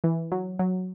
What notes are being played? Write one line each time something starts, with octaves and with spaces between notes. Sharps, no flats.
E3
F#3
F#3